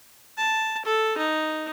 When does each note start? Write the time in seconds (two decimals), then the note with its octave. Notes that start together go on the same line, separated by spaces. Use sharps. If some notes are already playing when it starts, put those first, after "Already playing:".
0.37 A5
0.86 A4
1.18 D#4